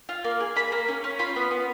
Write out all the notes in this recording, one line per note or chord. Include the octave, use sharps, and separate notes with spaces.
F4
A#3
G#4
A#3 B5
A#3
C#4
C#4
F4 B5
B3
B3